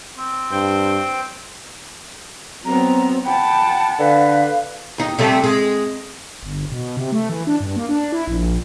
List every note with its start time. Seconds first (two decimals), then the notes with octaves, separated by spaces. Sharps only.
0.18 C4
0.52 G2 C5 G5
2.65 F#3 B3 C4 A#5
3.25 F#5 G5 A5 B5
3.99 D3 B4 F5
4.98 D#2 D#4
5.19 C3 G3 A3
5.44 G#3
6.43 G1
6.72 B2
6.97 C3
7.12 A3
7.30 E3
7.47 D4
7.60 G2
7.76 A#3
7.89 D4
8.12 E4
8.28 A#1